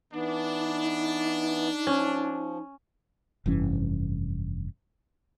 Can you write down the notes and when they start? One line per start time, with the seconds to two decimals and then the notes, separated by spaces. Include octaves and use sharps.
0.13 E3 B3 D4 D#4
1.87 F3 C#4
3.46 F1 G2 E3 C#4